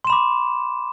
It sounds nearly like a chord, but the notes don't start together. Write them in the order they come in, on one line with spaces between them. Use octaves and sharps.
C6 E7 B5 D6